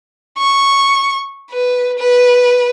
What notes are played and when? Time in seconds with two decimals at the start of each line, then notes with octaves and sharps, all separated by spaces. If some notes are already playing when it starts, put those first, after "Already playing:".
0.38 C#6
1.51 B4
1.99 B4